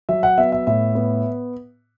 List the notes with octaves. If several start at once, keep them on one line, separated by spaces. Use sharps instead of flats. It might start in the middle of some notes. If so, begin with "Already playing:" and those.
F#3 E5
F#5
B3 E5
E5
A2 E5
B3